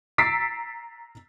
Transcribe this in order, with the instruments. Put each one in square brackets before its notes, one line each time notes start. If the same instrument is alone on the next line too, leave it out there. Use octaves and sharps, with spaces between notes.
[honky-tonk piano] A#5 E6 A6 B6 C7 D7